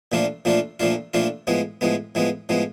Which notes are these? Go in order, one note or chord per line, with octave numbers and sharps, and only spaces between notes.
A#2 F3 A3 D4 F4
A#2 F3 A3 D4 F4
A#2 F3 A3 D4 F4
A#2 F3 A3 D4 F4
A2 F3 G#3 B3
A2 F3 G#3 B3
A2 F3 G#3 B3
A2 F3 G#3 B3